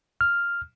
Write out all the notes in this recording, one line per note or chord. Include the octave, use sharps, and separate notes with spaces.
F6